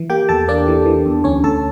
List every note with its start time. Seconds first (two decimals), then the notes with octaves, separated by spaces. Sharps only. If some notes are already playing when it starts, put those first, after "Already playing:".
Already playing: E3
0.10 A#3 G4 G5
0.29 E2 A4 A5
0.48 A#3 D4 D5
0.68 E3
0.86 E3
1.05 E2
1.24 D2 C#4 C#5
1.44 D2 A4 A5